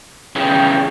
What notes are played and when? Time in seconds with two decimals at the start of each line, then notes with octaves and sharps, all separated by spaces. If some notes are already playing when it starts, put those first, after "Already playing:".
0.36 C#3 E3 G5